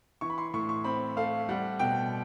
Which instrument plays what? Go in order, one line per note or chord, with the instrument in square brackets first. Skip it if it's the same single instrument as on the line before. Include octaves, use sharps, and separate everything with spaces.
[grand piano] E3 C#6
B5
C6
A2 C#6
C#6
C4 B5
A3 F5
G3 F#5
B2 G5